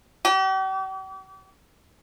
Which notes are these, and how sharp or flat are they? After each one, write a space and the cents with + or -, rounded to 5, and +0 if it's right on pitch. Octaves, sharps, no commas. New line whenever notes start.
G4 -45